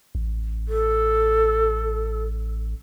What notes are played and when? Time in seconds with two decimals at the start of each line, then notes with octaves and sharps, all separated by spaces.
0.15 A1
0.68 A4